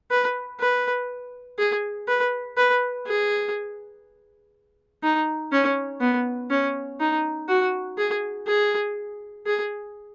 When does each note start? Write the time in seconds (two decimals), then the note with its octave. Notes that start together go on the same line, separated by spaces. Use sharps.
0.11 B4
0.59 B4
1.58 G#4
2.08 B4
2.57 B4
3.06 G#4
5.03 D#4
5.52 C#4
6.01 B3
6.50 C#4
6.99 D#4
7.48 F#4
7.98 G#4
8.47 G#4
9.46 G#4